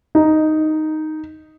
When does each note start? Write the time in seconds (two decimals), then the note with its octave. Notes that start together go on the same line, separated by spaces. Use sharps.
0.15 D#4